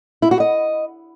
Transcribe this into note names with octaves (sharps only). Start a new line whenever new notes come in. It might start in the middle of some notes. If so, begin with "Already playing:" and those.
E4
F#4
D#5